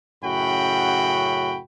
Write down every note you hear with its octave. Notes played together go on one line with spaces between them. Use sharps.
F#2 A2 C#3 F#4 G5 B5